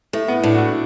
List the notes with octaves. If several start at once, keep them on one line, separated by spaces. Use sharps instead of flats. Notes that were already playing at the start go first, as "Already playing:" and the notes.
A2 A3
B3
A2 D4
F#4
E4